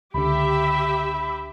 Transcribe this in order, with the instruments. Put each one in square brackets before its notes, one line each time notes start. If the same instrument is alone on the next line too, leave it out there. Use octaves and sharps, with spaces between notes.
[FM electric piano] C#2 D3 [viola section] G4 E5 [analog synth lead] B5